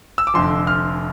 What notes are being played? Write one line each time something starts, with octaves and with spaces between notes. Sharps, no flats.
E6
D6
F1 F2 D3 F3 C6
F6